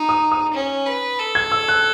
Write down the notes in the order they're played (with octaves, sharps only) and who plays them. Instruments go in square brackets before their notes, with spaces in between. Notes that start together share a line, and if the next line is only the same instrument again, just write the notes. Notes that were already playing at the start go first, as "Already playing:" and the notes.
Already playing: [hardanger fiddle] D#4
[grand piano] D#6
D#6
[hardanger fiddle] C#4
B4
A4
[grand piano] G#6
E6
F#6